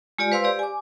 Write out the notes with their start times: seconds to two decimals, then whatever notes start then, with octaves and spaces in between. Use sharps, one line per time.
0.18 G#3 F4 G4 D5 G#5
0.32 B4 C5 F5 C6 E6
0.44 G4 D5
0.59 G#5 D6